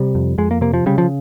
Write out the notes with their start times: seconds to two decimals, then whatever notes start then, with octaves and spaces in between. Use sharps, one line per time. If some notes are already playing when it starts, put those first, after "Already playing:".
Already playing: C3 G3
0.15 F2
0.38 F2 G#3
0.51 A#3
0.61 C3 A#3
0.74 F3
0.86 C#3 G3
0.98 F3